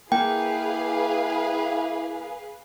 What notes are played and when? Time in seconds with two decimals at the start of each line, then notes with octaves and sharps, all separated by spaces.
0.12 A#3 E4 G#4 B4 F5 G5